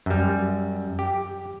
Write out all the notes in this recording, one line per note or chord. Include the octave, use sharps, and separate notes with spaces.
F#2 G3
G4